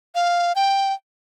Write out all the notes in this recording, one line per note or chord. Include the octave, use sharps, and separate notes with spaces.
F5
G5